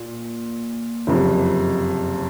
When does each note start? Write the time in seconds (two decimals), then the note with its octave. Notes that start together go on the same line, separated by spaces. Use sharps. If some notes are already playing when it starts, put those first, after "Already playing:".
Already playing: A#2
1.07 F#1 F2 C3